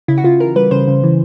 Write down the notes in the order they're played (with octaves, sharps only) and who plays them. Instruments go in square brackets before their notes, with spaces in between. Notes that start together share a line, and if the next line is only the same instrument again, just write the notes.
[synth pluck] C#3 E4
F#4
C#3 F4
E3 A#4
G3 B4
C#3 C5
C#3
E3